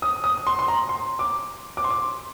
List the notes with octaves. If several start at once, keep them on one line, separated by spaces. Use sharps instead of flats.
D#6
D#6
C6
C6
A#5
C6
D6
D6
C6
D6